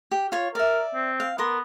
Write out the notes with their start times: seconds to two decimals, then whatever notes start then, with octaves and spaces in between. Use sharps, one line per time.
0.11 G4
0.32 F4 C#5
0.55 A#4 D5 E5
0.95 C4
1.20 F5
1.38 B3 A#4 C6 D6